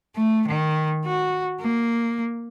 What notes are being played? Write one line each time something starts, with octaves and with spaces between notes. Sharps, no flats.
A3
D#3
F#4
A#3